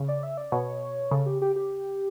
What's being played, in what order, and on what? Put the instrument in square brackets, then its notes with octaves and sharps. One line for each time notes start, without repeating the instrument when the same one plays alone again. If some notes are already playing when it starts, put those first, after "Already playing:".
Already playing: [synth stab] C#3
[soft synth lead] D5
E5
D5
[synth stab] B2 [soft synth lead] C#5
[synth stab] C#3 [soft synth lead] A4
[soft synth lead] G4
G4
G4